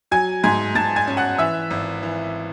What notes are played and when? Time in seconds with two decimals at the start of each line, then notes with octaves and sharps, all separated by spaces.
0.11 F#3 G#5 G#6
0.43 G#2 G#5 G#6
0.75 G#2 A5 A6
0.96 G#5 G#6
1.07 C#4
1.17 F#5 F#6
1.39 E3 E5 E6
1.71 G#1
2.03 E3